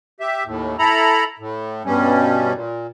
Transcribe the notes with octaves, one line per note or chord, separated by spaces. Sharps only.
G4 E5
D#2 A2
E4 A4 A#5 B5
A2
G2 B2 G3 C#4
A#2